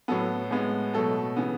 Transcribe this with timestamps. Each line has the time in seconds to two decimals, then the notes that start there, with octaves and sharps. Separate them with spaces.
0.08 A2 F#3 B3 A4
0.51 A2 G#3 B3
0.94 B2 F#3 A3 A4
1.36 C#3 E3 B3